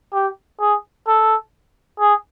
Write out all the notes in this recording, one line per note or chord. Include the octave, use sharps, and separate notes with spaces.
G4
G#4
A4
G#4